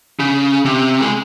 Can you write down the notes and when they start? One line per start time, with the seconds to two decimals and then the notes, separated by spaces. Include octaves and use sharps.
0.19 C#3
0.65 C3
1.01 G#3